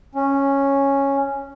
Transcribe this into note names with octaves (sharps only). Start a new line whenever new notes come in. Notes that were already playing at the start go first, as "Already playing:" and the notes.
C#4